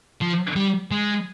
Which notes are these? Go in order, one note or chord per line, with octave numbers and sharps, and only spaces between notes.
F3
G3
G#3